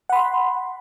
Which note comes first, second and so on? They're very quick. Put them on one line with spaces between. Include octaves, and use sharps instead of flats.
F#5 B5 C6